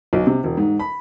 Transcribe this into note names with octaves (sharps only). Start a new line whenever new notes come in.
B1
C3
E1
G#2
B5